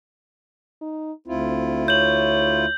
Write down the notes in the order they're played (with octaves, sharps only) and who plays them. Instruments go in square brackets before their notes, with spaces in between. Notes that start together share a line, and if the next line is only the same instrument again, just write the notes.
[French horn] D#4
[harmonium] D2 E4 F4 [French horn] C4
[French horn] C#5 [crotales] G6 F#7